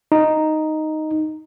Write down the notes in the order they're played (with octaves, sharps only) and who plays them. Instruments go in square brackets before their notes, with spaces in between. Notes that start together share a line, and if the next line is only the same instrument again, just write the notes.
[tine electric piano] D#4